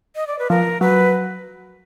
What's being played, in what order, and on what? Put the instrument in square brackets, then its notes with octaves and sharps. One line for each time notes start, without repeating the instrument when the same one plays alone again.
[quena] D#5
D5
B4
[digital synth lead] F3 [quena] A#4
[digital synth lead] F#3 [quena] B4